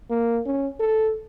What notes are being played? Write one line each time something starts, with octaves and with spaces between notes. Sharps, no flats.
A#3
C#4
A4